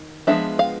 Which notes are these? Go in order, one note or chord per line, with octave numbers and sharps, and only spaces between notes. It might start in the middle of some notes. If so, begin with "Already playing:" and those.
Already playing: D#3
F3 G#3 B3 D4 E5
F5